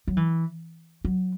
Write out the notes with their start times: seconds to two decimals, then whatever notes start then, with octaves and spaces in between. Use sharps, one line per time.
0.07 F#3
0.17 E3
1.05 F#3